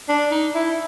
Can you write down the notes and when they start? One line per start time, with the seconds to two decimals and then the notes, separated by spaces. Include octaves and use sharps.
0.09 D4
0.31 D#4
0.55 E4